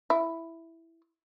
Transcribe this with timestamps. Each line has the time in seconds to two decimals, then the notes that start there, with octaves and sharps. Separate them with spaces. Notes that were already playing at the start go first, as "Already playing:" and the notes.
0.10 E4